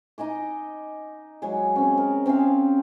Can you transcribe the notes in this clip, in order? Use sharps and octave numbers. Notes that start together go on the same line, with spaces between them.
D#4 D#5 G#5 D6
F#3 G#3 G#4
C4 C#4
A#4
C4 C#4 G#4 F5